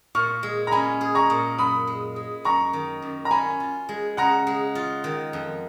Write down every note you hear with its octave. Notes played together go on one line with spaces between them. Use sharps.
A#2 C#6 F6
G#3
A#5
C#4 G#5 B5
G#4
A#5 C#6
A#2
F#2 B5 D#6
G#3
G#3
F#2 A#5 C#6
D#3
F#2
A#5
C#4 G#5 B5
F4
G#3
C#3 F#5 A#5
G#3
F4
D#3
F2